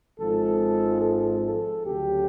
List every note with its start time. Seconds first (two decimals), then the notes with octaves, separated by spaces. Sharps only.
0.19 G#1 G#2 F3 G#3 A4
1.02 A4
1.44 A4
1.85 D2 C#3 F#3 G4